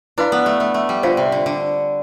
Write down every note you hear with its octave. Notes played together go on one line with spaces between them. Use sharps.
D4 E4 B4 F5 B5
B3
A3
A3
A3
G3
D3 F4 C5 F5
C3
D3
D3